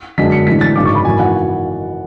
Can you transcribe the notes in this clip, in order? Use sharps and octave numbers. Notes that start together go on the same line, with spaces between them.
F#2 D3 G#3 D4 B6
C#7
A2 E3 G#3 D4 B6
A6
G#1 F#2 C#3 G#3 D4 D6
C#6
B5
G#1 F#2 E3 G#5
F#5